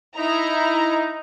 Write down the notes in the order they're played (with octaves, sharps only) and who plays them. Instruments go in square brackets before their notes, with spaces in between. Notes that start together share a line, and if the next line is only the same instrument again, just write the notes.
[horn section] D#4 [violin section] E4 A#5